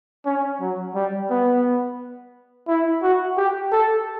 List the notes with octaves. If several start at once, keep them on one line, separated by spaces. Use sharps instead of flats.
C#4
F#3
G3
B3
E4
F#4
G4
A4